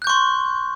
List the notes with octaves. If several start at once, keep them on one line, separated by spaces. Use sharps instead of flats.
C6 C#6 F#6 G6